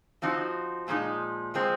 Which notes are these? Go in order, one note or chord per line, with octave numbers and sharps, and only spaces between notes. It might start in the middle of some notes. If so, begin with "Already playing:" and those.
F3 C4 D#4 F#4
A#2 F3 G#3 D#4
F3 G#3 C4